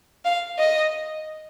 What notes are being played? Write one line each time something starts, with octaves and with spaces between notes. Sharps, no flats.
F5
D#5